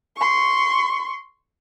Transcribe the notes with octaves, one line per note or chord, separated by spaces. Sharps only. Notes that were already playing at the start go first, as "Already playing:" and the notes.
C6 C#6